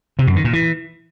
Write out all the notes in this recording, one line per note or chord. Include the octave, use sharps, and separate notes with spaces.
C3
F#2
D#3
A#2
E3